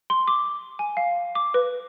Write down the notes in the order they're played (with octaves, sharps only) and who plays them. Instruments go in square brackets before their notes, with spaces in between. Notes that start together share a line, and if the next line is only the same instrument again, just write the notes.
[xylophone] C6
D6
G#5
F5
D6
B4